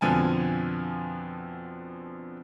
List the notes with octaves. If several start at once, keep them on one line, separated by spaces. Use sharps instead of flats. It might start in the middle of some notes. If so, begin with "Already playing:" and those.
F2 B2 D3 F3 G#5 A5